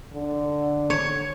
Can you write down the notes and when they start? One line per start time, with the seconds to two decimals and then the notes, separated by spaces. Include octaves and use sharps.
0.13 D3
0.90 C#5